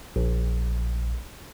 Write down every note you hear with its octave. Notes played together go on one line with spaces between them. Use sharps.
A#1